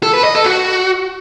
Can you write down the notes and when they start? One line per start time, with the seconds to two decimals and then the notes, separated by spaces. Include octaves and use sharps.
0.03 A4
0.14 B4
0.24 D#5
0.35 A4
0.46 F#4